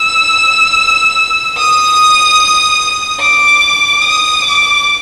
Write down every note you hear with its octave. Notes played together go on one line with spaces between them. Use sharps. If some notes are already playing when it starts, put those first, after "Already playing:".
Already playing: E6
D#6
D6
D#6
D6